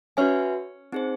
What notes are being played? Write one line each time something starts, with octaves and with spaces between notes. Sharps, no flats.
C#4 F#4 B4 E5 G#5
C4 D#4 G#4 C5